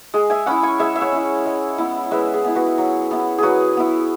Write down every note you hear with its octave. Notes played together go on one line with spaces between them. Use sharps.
G#3 G#4
E5 G#5
C#4 E4 F#5 B5
G#5 C#6
G#3 E5 G#5
E5
C#5 F#5
C#4 E4
G#3
B3 E4
G#3 B4 E5
G#4
B3 E4
F#4 B4
F#3
B3 E4
F#3 F#4 G#4 B4
B3 E4